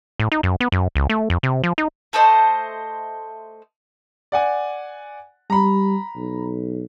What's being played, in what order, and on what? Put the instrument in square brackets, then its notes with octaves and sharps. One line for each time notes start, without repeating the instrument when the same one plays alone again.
[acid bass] A2
D#4
F#2
B3
F#2
C#2
A3
F2
C3
F3
D#4
[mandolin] A3 A4 C5 D#5
[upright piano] D5 F#5 G#5
[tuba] G3 [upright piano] A#5 B5
[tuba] B1